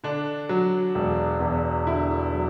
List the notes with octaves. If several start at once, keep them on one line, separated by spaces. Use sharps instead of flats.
D3 D4
F#3
E1
E2
D3 E4
F#3